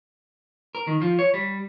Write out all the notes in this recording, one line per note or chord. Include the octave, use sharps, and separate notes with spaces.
A#4
D#3
F3
C#5
G3